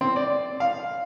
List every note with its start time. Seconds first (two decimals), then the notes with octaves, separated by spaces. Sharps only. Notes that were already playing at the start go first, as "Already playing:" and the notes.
0.01 C4
0.16 D5
0.60 F5